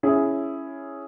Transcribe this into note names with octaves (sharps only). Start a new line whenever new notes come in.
C#4 E4 G#4